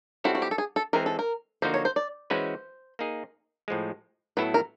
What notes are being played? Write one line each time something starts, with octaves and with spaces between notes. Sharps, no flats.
G3 C4 E4 F#4 A4 C#5
F#4
G4
A4
G#4
A4
E3 G#3 C4 A#4
A4
A#4
D3 F3 A#3 D#4 F#4 C5
C#5
C5
D5
E3 G#3 C#4 F#4 B4 C5
A#3 D#4 G#4
A2 F3 G#3
A2 F#3 B3 E4 A4 B4
A#4